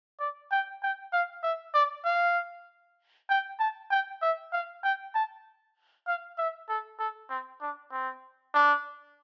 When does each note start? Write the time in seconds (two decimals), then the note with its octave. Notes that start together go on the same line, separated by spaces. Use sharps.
0.20 D5
0.51 G5
0.83 G5
1.13 F5
1.43 E5
1.74 D5
2.05 F5
3.29 G5
3.59 A5
3.91 G5
4.22 E5
4.53 F5
4.84 G5
5.15 A5
6.07 F5
6.38 E5
6.69 A4
6.99 A4
7.29 C4
7.61 D4
7.92 C4
8.54 D4